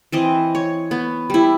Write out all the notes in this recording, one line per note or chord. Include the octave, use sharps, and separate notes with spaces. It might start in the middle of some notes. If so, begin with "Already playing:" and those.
E3 C4 D#5
C#5
B3
G3 E4